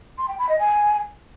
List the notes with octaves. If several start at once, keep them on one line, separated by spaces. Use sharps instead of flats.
C6
G5
B5
D#5
G#5